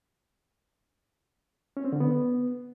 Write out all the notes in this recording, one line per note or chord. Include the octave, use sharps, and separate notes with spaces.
C#4
C4
D3
B3